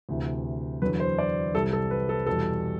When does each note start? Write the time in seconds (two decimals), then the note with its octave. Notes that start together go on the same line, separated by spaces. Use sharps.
0.09 D2 C3 E3
0.82 E2 D3 F#3 B4
1.00 C5
1.19 D5
1.54 C2 C3 G3 A4
1.73 A4
1.91 B4
2.09 A4
2.26 E2 B2 G3 A4